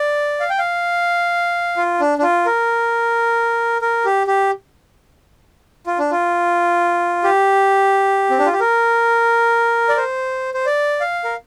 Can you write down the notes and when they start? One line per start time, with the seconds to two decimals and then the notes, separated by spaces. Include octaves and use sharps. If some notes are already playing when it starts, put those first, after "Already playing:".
Already playing: D5
0.40 F5
0.50 G5
0.59 F5
1.77 F4
2.00 D4
2.18 D4
2.22 F4
2.46 A#4
3.81 A#4
4.05 G4
4.27 G4
5.87 F4
5.99 D4
6.11 F4
7.24 G4
8.30 C4
8.39 D4
8.46 F4
8.52 G4
8.60 A#4
9.89 D5
9.97 C5
10.54 C5
10.66 D5
11.00 F5
11.24 A#4